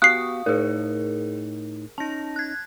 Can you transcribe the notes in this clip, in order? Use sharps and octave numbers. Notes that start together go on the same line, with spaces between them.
B3 F#4 G4 F5 C#6 D#6 F#6 C7
A2 D#4 G#4 A#4 C#5
C#4 D#4 A5 A#6
F#6 G#6